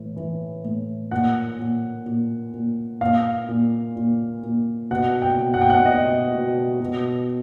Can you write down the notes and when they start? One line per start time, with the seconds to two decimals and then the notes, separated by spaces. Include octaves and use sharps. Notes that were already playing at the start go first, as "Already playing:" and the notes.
Already playing: A2 E3
0.17 E3
0.64 A2
1.11 A#2 F#5
1.59 A#2
2.06 A#2
2.54 A#2
3.01 A#2 F5
3.48 A#2
3.96 A#2
4.43 A#2
4.91 B2 F#5
5.22 G5
5.38 B2
5.54 F#5
5.61 G5
5.70 F#5
5.85 B2 D#5
6.33 B2
6.80 B2